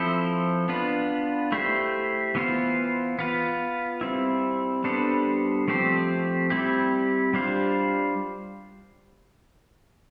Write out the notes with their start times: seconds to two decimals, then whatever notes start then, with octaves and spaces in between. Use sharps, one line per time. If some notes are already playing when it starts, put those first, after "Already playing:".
Already playing: F3 C4 E4 A4 C5
0.69 B3 D4 F4 B4
1.52 A3 E4 G4 C5
2.35 E3 B3 F4 C5
3.19 B3 F4 B4
4.01 G3 C4 E4
4.84 G3 B3 D4 A4 C5
5.68 F3 A3 C4 G4 C5
6.50 G3 C4 E4 G4
7.34 G3 D4 F4 C5